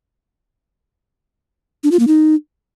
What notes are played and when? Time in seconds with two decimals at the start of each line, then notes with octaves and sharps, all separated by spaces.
1.84 D4
1.91 F4
1.99 A#3
2.07 D#4